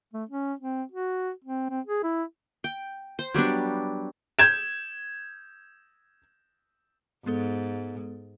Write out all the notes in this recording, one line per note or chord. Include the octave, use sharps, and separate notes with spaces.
A3
C#4
C4
F#4
C4
C4
G#4
E4
G5
C5
F#3 G3 B3 D4
G6 G#6 E7
G#2 G#3 B3 A4